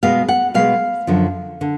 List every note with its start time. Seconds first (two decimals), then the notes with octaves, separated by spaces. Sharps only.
0.03 B2 G#3 B3 F5
0.28 F#5
0.54 B2 G#3 B3 F5
1.07 F#2 D3 F3
1.61 D3